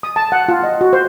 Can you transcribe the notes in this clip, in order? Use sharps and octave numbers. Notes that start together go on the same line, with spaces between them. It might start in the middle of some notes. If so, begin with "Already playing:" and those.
D#6
A5
F#5
F4
D#5
F#4
C5